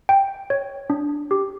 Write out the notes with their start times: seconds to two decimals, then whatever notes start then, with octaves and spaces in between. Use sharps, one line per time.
0.09 G5
0.50 C#5
0.90 D4
1.31 G4